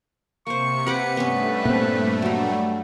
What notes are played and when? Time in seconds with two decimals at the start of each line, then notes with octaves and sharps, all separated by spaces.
0.47 C3 A#3 C5 C#6 C#7
0.86 G4 B4 F#5 D6
1.17 G2 A3 B3 C#4
1.65 A#2 C4
2.22 F#3 G3